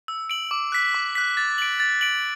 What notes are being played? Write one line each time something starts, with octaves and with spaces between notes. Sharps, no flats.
E6
D7 F#7
D6
F#6 B6
D6
F#6 B6
A6
D7 F#7
A6
D7 F#7